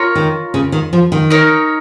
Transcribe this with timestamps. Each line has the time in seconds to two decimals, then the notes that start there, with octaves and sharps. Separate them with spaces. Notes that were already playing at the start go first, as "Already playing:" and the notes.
Already playing: F4 A#4 C#5
0.15 D#3
0.54 C#3
0.72 D#3
0.93 F3
1.12 D#3
1.30 D#4 A#4 C#5